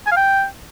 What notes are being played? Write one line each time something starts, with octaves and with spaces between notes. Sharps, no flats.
G#5
F5
G5